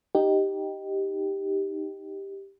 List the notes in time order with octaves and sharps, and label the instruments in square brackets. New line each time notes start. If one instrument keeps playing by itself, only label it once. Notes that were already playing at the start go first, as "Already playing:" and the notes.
[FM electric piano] D#4 G4